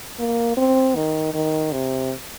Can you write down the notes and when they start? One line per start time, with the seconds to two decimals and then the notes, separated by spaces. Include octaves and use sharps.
0.19 A#3
0.57 C4
0.96 D#3
1.34 D#3
1.72 C3